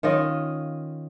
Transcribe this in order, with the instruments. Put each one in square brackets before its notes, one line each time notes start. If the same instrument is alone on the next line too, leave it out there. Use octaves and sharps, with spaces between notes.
[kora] D#3 C#4 F4 D#5